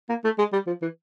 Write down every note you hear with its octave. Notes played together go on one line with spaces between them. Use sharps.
A#3
A3
G#3
G3
F3
E3